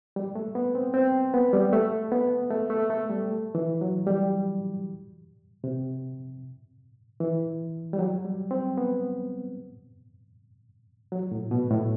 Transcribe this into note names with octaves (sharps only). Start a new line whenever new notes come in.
G3
A3
B3
C4
C4
B3
G3
A3
B3
A3
A3
A3
G3
E3
F#3
G3
C3
E3
G3
F#3
G3
C4
B3
F#3
A2
B2
A2